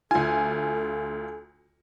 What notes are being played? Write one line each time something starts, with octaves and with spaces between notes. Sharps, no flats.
D2 F4 A4 G#5